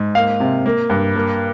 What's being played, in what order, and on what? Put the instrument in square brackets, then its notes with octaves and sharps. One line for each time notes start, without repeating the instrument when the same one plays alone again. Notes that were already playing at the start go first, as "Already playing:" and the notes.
Already playing: [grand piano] G#2
A#3 F5
C3
A#3
G2
A#3